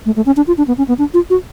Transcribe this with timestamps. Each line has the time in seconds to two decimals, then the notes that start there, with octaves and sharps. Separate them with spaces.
0.06 A3
0.16 A3
0.26 C#4
0.37 D4
0.47 F4
0.58 D4
0.68 B3
0.78 C#4
0.88 B3
0.99 D4
1.14 F4
1.30 F#4